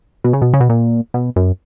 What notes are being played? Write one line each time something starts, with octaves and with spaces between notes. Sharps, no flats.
B2
C#3
B2
C#3
B2
A#2
B2
F#2